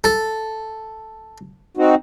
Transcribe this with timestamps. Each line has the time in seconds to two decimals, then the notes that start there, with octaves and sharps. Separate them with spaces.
0.04 A4
1.77 C4 D#4 F#4